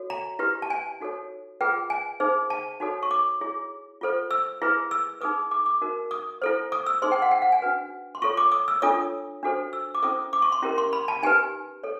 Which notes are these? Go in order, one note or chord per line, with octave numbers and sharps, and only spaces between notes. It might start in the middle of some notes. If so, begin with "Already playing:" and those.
Already playing: F#4 A4 C#5
A#5
E4 G4 B4
A5
G#5
D#4 F#4 A4 C#5
F4 G#4 B4 G5
G#5
D#4 G#4 C5
A5
D#4 F#4 A4 C#5
C#6
D6
E4 G#4 C#5
F4 A4 C5
E6
E4 G#4 B4
E6
D#4 G#4 B4 D#6
D6
D6
D#4 F#4 A#4
D#6
E4 A4 C5
D#6
E6
D#4 G#4 C5 C6
G5
F#5
G5
F#5
G#5
D4 F#4 B4
C6
F4 A4 C#5 C#6
D6
D#6
E6
D4 F4 A4 C#5 D#6
D4 F#4 A4 C5
E6
D6
C#4 E4 A4 C5 D#6
D6
C#6
C6
C#4 E4 G4 A#4
C6
B5
A5
D#4 G4 B4 G#5
A4 C#5